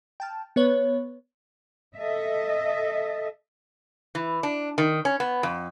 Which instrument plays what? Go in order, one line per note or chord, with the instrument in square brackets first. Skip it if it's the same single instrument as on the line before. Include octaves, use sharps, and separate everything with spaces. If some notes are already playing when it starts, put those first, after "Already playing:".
[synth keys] G5 A5 F6
B3 B4 C#5
[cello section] A4 D#5 E5
[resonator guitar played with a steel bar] E3
D4
D#3
C#4
B3
F2